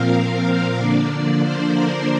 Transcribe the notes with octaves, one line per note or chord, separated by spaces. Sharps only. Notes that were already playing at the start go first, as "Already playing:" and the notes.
Already playing: A#2 F3 C4 A#4 F5
F5
D3 F3 A#3 D4 D5
C5
A#4